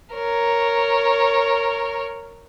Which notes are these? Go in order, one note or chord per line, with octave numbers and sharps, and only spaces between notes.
A#4 C#5